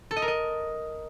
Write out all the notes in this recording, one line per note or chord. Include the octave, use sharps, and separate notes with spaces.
A4
D#5
A#4
D#5